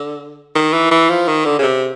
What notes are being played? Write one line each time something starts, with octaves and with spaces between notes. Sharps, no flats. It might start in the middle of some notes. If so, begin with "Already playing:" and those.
Already playing: D3
D#3
E3
E3
F3
D#3
D3
C#3
C3